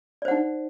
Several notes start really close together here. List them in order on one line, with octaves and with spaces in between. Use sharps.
D5 C5 F#5 D#4